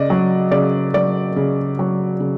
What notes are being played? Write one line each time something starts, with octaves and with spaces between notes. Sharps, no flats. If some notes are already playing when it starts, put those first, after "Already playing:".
Already playing: C#3 D5 D#5
F#3
C#3 D5
F#3 D5
C#3
F#3
C#3